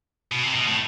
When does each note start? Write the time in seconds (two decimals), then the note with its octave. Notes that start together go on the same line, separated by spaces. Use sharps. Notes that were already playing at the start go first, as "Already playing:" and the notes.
0.32 B2
0.43 C3
0.55 B2
0.68 A2